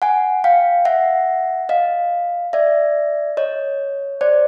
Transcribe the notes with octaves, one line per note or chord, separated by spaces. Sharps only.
F#5 G#5
F5 G5
E5 F#5
D#5 F5
D5 E5
C#5 D#5
C5 D5